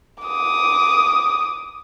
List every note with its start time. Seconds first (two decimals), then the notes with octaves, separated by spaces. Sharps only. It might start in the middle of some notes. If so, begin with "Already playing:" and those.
0.24 D6 D#6